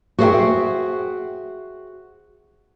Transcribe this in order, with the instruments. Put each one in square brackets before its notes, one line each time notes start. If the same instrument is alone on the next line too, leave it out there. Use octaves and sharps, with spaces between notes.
[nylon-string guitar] F#4 G#4 C5 C#5 E5 G5